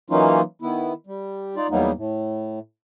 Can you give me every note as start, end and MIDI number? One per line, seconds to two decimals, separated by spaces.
0.10 0.41 52
0.10 0.41 54
0.10 0.41 58
0.10 0.41 61
0.10 0.41 63
0.10 0.41 65
0.62 0.93 51
0.62 0.93 59
0.62 0.93 64
1.07 1.55 55
1.56 1.67 63
1.56 1.67 65
1.56 1.67 74
1.70 1.91 40
1.70 1.91 54
1.70 1.91 55
1.70 1.91 58
1.70 1.91 59
1.70 1.91 63
1.96 2.59 45